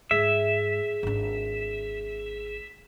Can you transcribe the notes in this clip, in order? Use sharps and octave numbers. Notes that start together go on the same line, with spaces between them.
G#2 G#4 E5
G#1 D4